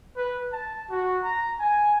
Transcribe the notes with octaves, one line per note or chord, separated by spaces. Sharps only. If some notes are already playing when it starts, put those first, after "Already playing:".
B4
A5
F#4
A#5
G#5